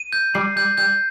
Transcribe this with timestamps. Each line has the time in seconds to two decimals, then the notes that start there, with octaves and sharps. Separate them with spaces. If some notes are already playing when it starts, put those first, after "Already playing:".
Already playing: D#7
0.13 G6
0.35 G3 C7
0.56 G3 G6
0.78 G3 G6